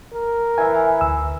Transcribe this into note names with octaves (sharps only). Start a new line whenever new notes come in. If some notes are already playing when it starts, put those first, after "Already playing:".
A#4
E3 E5 G#5
D2 E6